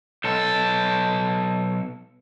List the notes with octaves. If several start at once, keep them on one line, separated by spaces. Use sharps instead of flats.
B1 A4